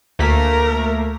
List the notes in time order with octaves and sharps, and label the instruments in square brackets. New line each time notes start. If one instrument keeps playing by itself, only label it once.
[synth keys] D2 B6 [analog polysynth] A3 A#3 [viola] A#4